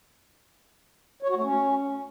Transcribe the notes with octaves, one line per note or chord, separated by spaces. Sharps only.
C#5
F#4
A3
C#4